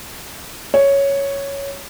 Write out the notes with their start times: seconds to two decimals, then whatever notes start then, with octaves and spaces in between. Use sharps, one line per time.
0.74 C#5